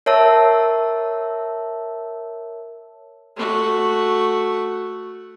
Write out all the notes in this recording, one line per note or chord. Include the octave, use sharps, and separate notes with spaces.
A#4 C#5 E5 A5 E6
A3 F#4